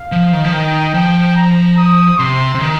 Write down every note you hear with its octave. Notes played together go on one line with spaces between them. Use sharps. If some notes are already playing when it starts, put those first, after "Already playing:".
Already playing: F5
F3
D#3
F3
D#3 G5
F3 G5
A#5
D#6
C3 C6
C3
D#3